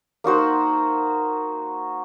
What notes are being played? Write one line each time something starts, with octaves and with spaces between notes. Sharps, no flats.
A#3 D#4 F#4 C5